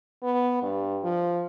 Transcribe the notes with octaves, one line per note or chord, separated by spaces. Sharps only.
B3
G2
F3